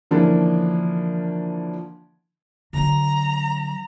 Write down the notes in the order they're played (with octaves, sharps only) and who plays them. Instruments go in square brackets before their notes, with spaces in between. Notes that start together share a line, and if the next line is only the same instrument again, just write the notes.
[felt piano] D3 E3 F3 A#3 C#4 D4
[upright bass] D3 F#3 [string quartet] A#5